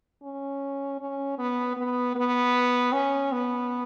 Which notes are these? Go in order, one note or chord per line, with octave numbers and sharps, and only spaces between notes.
C#4
C#4
B3
B3
B3
C#4
B3